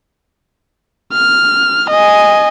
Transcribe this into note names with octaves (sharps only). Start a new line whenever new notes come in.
F6
D#5 G#5